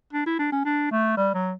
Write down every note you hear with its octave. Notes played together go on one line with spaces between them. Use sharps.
D4
E4
D4
C#4
D4
A3
G3
F#3